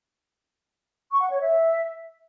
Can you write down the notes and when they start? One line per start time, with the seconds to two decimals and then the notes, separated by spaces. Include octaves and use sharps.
1.11 C#6
1.20 F#5
1.30 C#5
1.40 E5